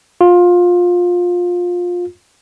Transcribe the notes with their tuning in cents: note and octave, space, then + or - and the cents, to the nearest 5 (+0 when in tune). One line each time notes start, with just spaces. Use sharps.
F4 +20